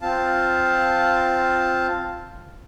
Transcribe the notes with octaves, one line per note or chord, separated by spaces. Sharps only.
C4 F4 F5 A5